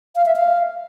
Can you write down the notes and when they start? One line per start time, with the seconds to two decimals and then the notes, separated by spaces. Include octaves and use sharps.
0.16 F5
0.26 E5
0.36 F5